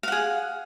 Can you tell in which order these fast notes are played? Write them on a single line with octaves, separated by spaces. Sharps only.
F5 F#5 G#4